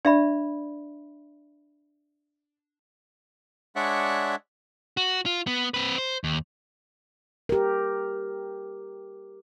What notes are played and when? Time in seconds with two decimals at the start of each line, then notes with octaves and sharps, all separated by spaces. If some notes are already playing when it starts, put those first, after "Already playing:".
0.05 D4 D5 E5 B5
3.76 G#3 D4 C#5 D5 E5 F#5
4.97 F#4
5.26 F4
5.47 B3
5.74 C4 B4
5.98 C5
6.24 D#2
7.49 G4 A#4